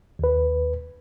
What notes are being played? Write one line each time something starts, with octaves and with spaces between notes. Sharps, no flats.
D#2 B4